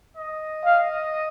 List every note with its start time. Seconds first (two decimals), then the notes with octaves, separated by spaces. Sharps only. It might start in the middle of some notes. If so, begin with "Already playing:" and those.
0.17 D#5
0.64 F5